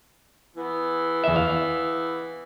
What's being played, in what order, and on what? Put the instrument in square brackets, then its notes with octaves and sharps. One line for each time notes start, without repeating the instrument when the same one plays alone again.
[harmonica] E3 B3
[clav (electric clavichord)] E2 E5
F5